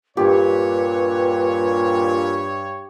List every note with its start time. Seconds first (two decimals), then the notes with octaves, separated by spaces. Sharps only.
0.17 G2 A#2 G4 B4 C#5